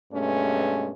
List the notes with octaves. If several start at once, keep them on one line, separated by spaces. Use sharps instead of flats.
G2 B2 G#3 A3 C#4